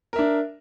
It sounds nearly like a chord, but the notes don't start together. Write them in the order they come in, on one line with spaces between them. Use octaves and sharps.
A#4 E5 D4